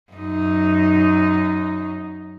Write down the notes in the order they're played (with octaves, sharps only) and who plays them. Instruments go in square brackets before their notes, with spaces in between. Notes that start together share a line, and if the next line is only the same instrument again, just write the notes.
[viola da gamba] F#2 D#4